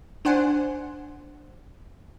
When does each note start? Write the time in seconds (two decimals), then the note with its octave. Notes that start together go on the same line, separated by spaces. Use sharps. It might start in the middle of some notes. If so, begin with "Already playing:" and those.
0.25 D4 C5 F#5 G#5